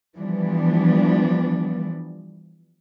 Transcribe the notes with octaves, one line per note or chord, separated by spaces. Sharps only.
E3 F3 G3 B3 D4